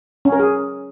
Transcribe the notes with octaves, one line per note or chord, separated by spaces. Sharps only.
C#4
A#4
G#4